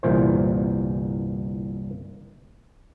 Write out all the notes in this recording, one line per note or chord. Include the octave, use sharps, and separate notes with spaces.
G1 C2 A#2 E3 C5